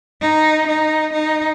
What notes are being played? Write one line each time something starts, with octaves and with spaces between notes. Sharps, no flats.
D#4
D#4
D#4